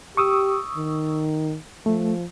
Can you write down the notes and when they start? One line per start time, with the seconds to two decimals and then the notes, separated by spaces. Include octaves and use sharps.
0.17 G4 C#6 D#6 E6
0.77 D#3
1.86 F3 A3